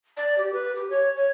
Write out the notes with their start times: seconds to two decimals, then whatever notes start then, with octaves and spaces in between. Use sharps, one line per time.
0.17 D5
0.38 G4
0.53 B4
0.75 G4
0.90 C#5
1.16 C#5